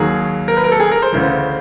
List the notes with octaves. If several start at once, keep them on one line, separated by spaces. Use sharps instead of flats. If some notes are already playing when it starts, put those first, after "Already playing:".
Already playing: D#2 D#3 F#3 G#4
A#4
B4
A#4
A4
G#4
A#4
C5
D2 C#3 E3